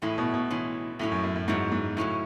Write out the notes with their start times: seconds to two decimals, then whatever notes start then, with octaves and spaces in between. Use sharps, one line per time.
0.02 A2 E3 G#3 C#4 E4
0.18 B2
0.34 B2
0.50 E3 G#3 C#4 E4
0.99 A2 F#3 C#4 E4
1.12 F#2
1.23 F#2
1.35 F#2
1.48 G#2 F#3 C#4 E4
1.72 G#2
1.97 A2 C#3 F#3 C#4 E4